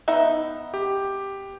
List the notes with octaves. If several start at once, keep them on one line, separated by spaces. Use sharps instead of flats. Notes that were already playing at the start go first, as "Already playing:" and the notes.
B3 D#4 E5
G4